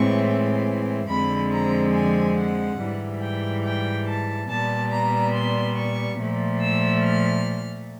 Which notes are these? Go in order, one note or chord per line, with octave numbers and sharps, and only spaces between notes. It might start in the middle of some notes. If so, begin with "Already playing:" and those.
Already playing: A2 E3 G#3 C4 C#6
F2 D3 F3 G#3 C4 B5
A#5
G#5
F#5
G#2 E3 G3
G5
G5
A5
A#2 G3 B3 A5
A#5
C6
C#6
A#2 F3 A3
E6
F6